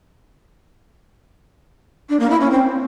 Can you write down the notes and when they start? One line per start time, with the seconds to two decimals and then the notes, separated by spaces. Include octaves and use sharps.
2.09 D4
2.20 A#3
2.30 E4
2.41 C#4
2.51 C4